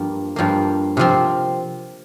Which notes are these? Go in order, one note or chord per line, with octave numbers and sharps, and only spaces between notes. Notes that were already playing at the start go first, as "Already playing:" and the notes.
Already playing: G2 F3 A#3
G2 F3 A#3
C3 F3 C4